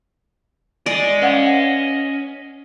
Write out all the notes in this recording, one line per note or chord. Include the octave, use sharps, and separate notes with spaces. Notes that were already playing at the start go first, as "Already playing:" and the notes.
D5 D#5 G#5
C#4 B4 F5 F#5